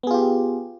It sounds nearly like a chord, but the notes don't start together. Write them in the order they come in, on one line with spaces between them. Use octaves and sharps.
B3 G#4 F4 G4